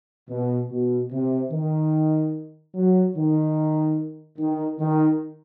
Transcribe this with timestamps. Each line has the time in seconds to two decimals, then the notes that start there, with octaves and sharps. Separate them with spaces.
0.29 B2
0.71 B2
1.12 C3
1.52 D#3
2.75 F#3
3.16 D#3
4.38 D#3
4.80 D#3